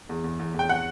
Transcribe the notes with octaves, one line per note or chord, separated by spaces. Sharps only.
E2
E2
E2
E2
G5
F#5